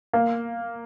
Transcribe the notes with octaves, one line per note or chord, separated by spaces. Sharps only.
A#3